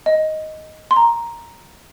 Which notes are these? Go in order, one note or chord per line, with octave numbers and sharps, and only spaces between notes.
D#5
C6
A#5